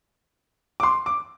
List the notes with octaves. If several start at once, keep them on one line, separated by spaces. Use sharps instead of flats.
D6
C6
D6